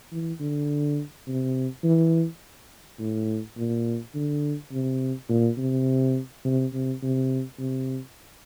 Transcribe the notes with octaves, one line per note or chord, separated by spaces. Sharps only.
E3
D3
C3
E3
A2
A#2
D3
C3
A#2
C3
C3
C3
C3
C3